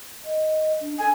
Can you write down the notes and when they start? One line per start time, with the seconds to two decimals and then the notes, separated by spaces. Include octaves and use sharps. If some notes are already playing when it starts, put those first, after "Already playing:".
0.24 D#5
0.80 D4
0.99 A4 G#5